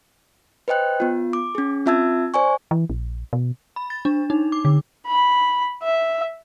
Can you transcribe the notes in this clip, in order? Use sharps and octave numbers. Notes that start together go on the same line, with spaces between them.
B4 C5 D#5 G5 F#6
B3 F4
D6
C#4 G#4
C4 F4 E5 A5 E6 G#6
C5 D5 G#5 C#6
E3
A#1
B2
B5
A6
D4
D#4
D6
D3
B5
E5